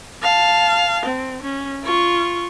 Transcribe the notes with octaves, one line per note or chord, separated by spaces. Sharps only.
F5 A5
C4
C#4
F4 C#6